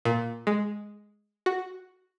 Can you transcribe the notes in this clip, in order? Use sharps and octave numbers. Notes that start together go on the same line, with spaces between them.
A#2
G#3
F#4